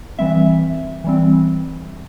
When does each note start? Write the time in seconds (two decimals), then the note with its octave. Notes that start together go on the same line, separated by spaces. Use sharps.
0.19 E3 G3 C4 E5
1.04 E3 G3 C4